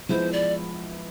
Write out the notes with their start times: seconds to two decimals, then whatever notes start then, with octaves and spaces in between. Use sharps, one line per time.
0.09 F3 G#3 B3 E4 C5
0.33 D5